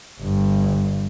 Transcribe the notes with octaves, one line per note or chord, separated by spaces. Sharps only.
G1 G2